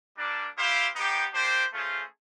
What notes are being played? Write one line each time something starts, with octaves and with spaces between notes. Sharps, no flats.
G3 A#3 D4
E4 G4 C5 F5
B3 D#4 G4 C5
A#3 D4 G4 C5
A3 C#4 F4 G#4 C5